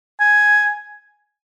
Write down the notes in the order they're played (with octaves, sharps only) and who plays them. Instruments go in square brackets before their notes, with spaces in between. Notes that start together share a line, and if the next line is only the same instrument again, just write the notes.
[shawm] G#5